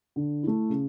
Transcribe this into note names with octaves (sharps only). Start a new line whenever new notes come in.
D3
A3 E4
C#3